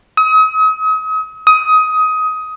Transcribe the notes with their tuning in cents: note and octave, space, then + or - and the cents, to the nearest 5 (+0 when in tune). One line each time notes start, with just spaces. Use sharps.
D#6 +40
D#6 +20